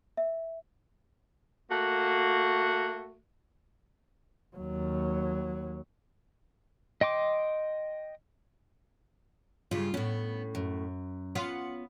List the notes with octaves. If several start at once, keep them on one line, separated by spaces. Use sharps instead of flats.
E5
A3 A#3 F#4
D#2 F#3
D#5 G5 C6 D6
G2 C#3 F4
A2 B3 C#4
F#2
B3 C#4 F4 F#5